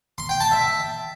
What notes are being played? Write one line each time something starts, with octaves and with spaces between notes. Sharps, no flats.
C6
G5
A5
E5